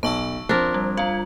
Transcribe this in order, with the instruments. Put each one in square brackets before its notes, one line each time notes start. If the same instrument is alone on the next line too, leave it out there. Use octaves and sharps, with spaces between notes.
[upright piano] B1 [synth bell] A5 C#6 E6
[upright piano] F3 C4 [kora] D4 A#4
[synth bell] G3
[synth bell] G3 F4 [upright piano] F5